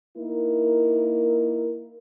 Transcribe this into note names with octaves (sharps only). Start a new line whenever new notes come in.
A#3 D#4 E4 A#4